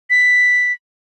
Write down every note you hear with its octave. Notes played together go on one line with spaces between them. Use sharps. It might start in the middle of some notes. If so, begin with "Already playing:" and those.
B6